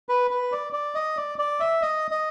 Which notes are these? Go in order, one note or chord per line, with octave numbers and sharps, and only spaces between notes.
B4
B4
D5
D5
D#5
D5
D5
E5
D#5
D#5